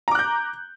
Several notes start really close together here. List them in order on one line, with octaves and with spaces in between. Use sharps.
A#5 D6 F#6 G6